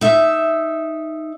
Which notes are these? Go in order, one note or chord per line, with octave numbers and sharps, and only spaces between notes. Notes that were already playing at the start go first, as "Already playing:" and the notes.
D#4 E5